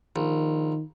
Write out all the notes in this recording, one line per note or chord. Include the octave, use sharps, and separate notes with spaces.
A#1 D#3